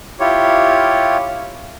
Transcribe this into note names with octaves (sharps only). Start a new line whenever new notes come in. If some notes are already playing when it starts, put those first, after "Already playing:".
E4 F4 G4 C#5